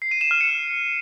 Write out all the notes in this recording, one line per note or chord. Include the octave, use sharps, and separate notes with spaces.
C7
D#7
E7
F6
C#7